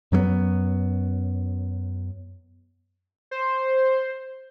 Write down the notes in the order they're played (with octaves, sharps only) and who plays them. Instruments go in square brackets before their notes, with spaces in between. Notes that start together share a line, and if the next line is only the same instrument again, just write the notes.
[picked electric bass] F#2 F#3 G3 B3
[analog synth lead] C5